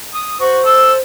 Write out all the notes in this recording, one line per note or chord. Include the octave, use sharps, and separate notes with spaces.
D#6
F#4 C5
A4 E6